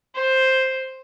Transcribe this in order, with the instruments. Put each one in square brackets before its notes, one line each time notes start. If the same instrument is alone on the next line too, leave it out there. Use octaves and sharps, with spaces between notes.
[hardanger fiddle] C5